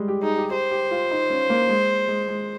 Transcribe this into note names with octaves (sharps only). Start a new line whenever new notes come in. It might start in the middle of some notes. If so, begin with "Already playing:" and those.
Already playing: G3 G#3
G4
D#4 G#4
G4
G4 C5
G4
F4
D#4
C#4
A#3
G#3
G#3
G#3